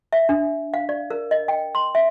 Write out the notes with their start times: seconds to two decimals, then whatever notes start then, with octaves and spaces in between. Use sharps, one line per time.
0.13 E5
0.29 D4
0.74 F5
0.89 D5
1.11 A#4
1.31 D#5
1.48 G5
1.75 C6
1.95 E5